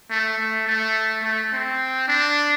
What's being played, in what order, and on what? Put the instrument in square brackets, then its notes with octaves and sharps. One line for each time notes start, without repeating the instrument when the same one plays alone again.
[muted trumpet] A3
A3
A3
A3
C4
D4